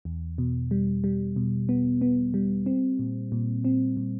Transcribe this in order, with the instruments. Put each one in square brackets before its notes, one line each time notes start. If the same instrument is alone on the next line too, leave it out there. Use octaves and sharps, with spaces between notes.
[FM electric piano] E2
B2
G3
G3
B2
B3
B3
G3
C4
A#2
A#2
C4
A#2